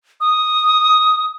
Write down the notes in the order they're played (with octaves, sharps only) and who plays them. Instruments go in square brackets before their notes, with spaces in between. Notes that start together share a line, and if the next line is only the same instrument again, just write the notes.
[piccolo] D#6